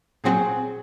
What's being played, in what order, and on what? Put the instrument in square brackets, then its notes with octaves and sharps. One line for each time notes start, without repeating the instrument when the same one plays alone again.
[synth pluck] A#2 F#3 C4 F#4 [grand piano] G#4